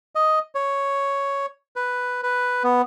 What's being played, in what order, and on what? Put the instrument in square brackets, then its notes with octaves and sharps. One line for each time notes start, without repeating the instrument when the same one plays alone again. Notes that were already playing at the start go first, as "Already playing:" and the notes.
[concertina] D#5
C#5
B4
B4
B3